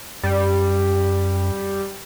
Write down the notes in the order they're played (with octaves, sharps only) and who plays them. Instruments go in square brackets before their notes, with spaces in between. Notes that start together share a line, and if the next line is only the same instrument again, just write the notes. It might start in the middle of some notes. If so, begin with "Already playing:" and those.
[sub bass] F#2 [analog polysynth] G3